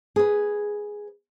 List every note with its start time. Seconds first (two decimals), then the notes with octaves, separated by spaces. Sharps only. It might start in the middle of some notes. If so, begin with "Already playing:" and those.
0.16 G#4 B4